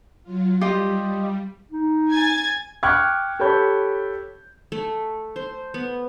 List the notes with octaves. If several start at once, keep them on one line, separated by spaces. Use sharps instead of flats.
F#3 F4
G3 F4 G4 D#5
D#4
G#5 G#6 A6
G5 C#6 D6 F6 F#6 G#6
G4 A4 C#5 B5 G6
A3
C5
B3